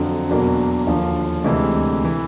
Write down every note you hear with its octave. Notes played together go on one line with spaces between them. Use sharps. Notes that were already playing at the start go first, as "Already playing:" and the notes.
Already playing: F2 D3 F#3
E2 B2 F#3 A#3 D4
D#2 D3 F3
D2 C3 E3 G#3
E3